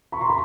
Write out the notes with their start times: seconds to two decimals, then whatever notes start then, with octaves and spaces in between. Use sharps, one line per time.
0.12 B5 C#6
0.21 A#5 C6
0.30 B5 C#6